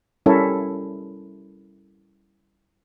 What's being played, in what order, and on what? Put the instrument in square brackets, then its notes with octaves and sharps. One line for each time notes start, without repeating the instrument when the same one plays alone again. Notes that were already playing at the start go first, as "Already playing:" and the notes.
[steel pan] G3 C#4 E4 A4 A#4 C#5